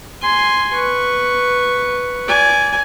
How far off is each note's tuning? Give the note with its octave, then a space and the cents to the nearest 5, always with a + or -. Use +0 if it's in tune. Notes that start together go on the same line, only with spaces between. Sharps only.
G#5 +0 C6 +0
B4 +0 C#6 +0
D5 -25 G#5 +0